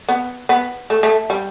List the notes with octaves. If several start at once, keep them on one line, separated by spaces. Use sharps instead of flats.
B3
B3
A3
A3
G3